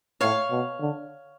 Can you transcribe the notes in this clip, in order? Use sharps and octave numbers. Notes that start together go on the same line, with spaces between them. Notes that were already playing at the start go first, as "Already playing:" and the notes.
A2 C#5 F5
B2
D3